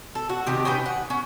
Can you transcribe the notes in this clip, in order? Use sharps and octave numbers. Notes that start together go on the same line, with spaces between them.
A4
F#4
C3 D#3 G4 D#5
C#4 D#4 B4 G5
F#5
C#4